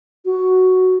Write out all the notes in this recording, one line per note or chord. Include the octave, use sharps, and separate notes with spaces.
F#4